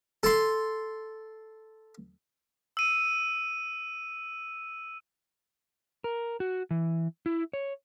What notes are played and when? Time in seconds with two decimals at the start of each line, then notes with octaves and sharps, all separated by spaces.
0.23 A4 C6
2.77 E6 D#7
6.04 A#4
6.40 F#4
6.71 E3
7.26 E4
7.53 C#5